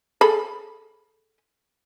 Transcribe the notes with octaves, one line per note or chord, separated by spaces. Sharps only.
G#4 A4 B5